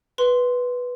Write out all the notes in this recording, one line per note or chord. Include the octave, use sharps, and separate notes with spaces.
B4 C6